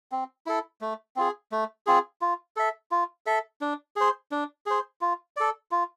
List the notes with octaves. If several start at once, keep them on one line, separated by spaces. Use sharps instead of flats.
C4
E4 A4
A3
C4 F4 G#4
A3
C4 F4 G#4
F4
A4 E5
F4
A4 E5
D4
G#4 C5
D4
G#4 C5
F4
A4 D5
F4